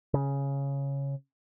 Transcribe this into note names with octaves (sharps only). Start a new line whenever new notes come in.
C#3